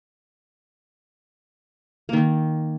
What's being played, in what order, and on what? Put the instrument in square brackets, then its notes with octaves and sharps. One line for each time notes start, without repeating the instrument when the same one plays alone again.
[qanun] D#3 A#3